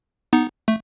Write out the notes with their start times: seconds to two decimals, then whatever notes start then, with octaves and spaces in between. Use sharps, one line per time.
0.33 B3 D#4
0.68 A3